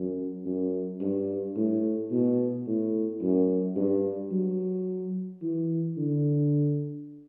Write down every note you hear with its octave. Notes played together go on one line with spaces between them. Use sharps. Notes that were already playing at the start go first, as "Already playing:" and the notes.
Already playing: F#2
F#2
G2
A2
B2
A2
F#2
G2
F#3
E3
D3